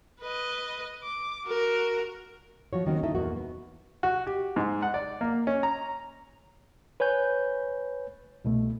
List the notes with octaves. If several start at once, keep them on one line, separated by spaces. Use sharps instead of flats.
B4 D#5
D6
F#4 A#4
F3 F#4 C#5
D#2 D#3 C4 C#4 F#4
D#4 E4 A4 E5
E2 A#2 A#3 F#4
B3
F#4
G4
G#2
F#5
D5
A#3
C#4
A#5
B4 C#5 G#5 G6
C2 B2 A3